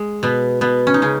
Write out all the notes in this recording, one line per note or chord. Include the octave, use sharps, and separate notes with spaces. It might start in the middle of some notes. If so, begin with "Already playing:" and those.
Already playing: G#3
B2 B3
B2 B3
C#4
D#4
C#3 C#4